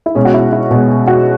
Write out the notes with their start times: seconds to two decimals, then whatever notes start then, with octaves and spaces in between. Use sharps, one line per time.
0.06 E4
0.15 B2 G#3 C#4
0.25 F#4
0.34 E4
0.52 E4
0.71 B2 G#3
0.89 G#4
1.07 F#4